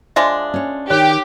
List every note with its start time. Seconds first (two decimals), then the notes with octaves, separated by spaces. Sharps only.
0.16 F3 G#3 D4 E5
0.54 C#4 C#5
0.90 D#3 G4 C#5